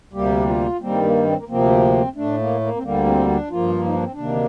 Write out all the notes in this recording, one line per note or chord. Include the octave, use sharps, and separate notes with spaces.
D2 C3 G3 A#3 G4
F4
G2 D#3 G3 A#3 C4
A#3
C4
A#3
D2 C3 F3 A#3 C4
A2 A3 D4
A#3
A#3
C4
D2 D3 G3 A#3
C4
D4
G2 F3 A#3 F4
D#4
D4
C4
D4
D2 C3 D#3 A#3